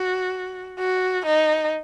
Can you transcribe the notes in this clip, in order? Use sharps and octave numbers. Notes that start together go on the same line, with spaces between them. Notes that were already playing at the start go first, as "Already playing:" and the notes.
Already playing: F#4
F#4
D#4